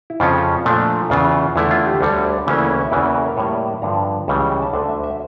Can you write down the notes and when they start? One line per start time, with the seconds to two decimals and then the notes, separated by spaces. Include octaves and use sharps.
0.10 E4
0.20 F2 C#3 F3 C#4 F4
0.65 A#2 F3 A3 D4
1.10 E2 C#3 E3 F4
1.56 E2 D3 A3 E4
1.71 F4
1.86 G4
2.00 D2 D3 G3 A4
2.12 C#5
2.24 D5
2.47 D2 C#3 E3 A#3 C#4
2.58 E4
2.68 C#5
2.81 E5
2.91 E2 C#3 E3 A#3 D5
3.03 C#5
3.14 A#4
3.25 A#4
3.37 A2 G3 A#3 C#5
3.52 D5
3.68 A5
3.82 G2 D3 F3 A#5
4.28 C#2 C#3 E3 G3 A5
4.39 F5
4.50 G5
4.62 A5
4.73 D2 D3 A3 A5
4.89 E5
5.04 E5